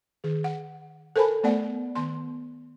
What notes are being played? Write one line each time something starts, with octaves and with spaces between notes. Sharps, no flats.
D#3 G#4
F#5
A4 A#4 C5 G#5 A5 B5
A3 B3 D5 F#5
D#3 B3 C6